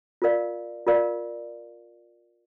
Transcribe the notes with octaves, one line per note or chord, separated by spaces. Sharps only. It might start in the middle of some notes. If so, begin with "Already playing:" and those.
F4 A#4 D5 F5
F4 A#4 D5 F5